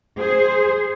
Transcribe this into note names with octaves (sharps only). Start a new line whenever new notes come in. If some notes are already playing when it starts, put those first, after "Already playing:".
G#4 C5